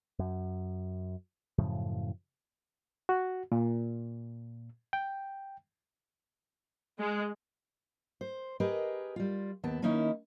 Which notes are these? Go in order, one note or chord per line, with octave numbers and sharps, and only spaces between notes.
F#2
F#2 A2 C#3 F3
F#4
A#2
G5
G#3
C5
G4 G#4 A#4 B4 D#5
G3 F4
D#2 B3 A5
D#3 A#3 C#4 D#4 E4